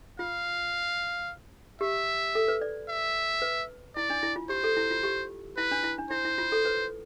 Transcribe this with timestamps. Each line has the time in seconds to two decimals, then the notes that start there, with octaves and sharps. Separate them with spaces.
0.19 F4 F5
1.81 G4 E5
2.35 A4
2.48 B4
2.61 D5
2.89 E5
3.42 B4
3.96 E4 D5
4.10 D4
4.23 E4
4.36 F4
4.49 G4 C5
4.64 A4
4.77 E4
4.91 F4
5.03 G4
5.57 E4 B4
5.71 D4
5.84 E4
5.98 D4
6.11 E4 C5
6.25 E4
6.38 F4
6.52 A4
6.65 B4